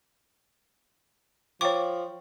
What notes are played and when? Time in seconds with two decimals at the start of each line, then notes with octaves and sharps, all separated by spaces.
1.61 F3 C#5 G5 C#6 D6